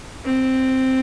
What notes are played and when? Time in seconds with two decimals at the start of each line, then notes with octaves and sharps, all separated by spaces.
0.25 C4